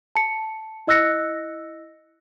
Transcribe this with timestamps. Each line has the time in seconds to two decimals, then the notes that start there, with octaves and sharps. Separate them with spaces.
0.15 A5 C#7
0.87 E4 D#5 E6 F#6 A#6 C#7